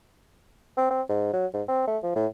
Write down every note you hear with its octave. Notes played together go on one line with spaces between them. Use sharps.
C4
C4
G#2
F#3
G#2
C4
A3
F3
A2